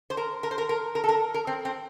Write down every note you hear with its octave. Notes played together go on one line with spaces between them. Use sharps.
C5
A#4
A#4
C5
A#4
A#4
A#4
A4
A#4
A#4
C4
C4